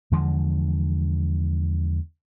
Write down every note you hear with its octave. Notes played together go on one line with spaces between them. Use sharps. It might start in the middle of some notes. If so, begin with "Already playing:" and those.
E2 D3 F3 G#3